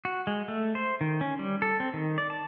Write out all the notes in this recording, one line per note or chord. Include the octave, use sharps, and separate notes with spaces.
F#4
G#3
A3
C5
D#3
C#4
G3
A4
C4
D#3
D5
A5